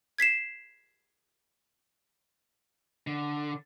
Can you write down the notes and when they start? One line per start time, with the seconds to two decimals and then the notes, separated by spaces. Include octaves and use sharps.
0.18 G#6 B6 C7 E7
3.07 D3